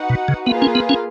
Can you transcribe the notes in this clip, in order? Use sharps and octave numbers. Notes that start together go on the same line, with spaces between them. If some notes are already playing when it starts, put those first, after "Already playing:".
Already playing: D#4 F#4 B4 F#5
B2
C#3
A#3 B3 F4 G#4 B4 F5
C#4
B3
C#4